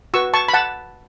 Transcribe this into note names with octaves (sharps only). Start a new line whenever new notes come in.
F#4 B4 C#6 E6
A5 C#6
B5
F#5 A5